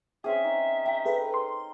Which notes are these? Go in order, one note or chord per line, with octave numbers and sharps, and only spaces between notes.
C4 C#4 G#4 E5
D#4
G5 A#5
G#4 A4 B4
C6